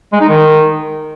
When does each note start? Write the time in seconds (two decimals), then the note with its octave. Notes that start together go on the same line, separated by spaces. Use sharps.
0.12 G#3
0.21 D#4
0.29 D#3